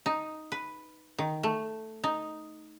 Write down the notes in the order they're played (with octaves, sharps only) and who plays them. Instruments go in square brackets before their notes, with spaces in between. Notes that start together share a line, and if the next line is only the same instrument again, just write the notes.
[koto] D#4
B4
D#3
A3
D#4